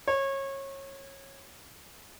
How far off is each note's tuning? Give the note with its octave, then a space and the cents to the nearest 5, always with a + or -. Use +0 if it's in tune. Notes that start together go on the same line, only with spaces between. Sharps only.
C#5 -25